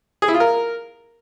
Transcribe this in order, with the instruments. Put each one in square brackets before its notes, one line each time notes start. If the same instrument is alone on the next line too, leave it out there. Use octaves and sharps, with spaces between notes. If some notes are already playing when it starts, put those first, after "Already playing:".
[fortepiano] G#4
E4
F4
A#4